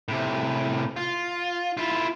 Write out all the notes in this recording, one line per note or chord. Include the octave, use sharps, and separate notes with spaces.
A2 C3
F4
E4 F4